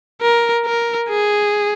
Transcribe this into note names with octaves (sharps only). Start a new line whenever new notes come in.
A#4
A#4
G#4